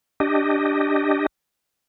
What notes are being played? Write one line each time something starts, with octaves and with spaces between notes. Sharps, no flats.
D4 G4 D#5